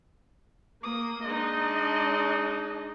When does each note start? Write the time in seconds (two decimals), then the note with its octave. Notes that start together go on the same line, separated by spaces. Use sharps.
0.83 A#3 D#6
1.25 G#3 D4 D#4 D#5